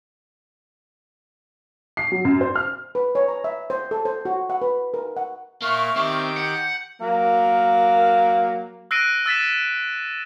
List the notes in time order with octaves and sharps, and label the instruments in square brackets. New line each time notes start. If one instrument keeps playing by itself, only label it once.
[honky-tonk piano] C7
F#3
F#2
C5
F6
[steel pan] B4
C#5
A#5
E5
C5
A4
C5
F#4
F#5
B4
A#4
F#5
[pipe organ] A#2 F5 [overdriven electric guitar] A#3 [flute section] E5 C#6 F6
[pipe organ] D#3 G4 D6 [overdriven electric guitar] C4
[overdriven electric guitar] F#5 [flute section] G6
[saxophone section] F#3 A#3 A#4
[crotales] E6 F#6 A#6 C7 D7 D#7
E6 A6 B6 E7